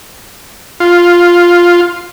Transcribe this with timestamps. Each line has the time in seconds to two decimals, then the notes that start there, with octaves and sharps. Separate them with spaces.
0.80 F4